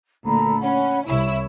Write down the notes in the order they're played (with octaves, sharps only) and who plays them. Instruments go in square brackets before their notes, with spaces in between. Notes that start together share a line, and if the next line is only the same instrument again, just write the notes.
[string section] D2 A#2 [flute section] A4 A#5 B5
[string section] C#4 [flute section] F#5 B5
[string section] C2 E4 E6 [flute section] C#5 E5 C#6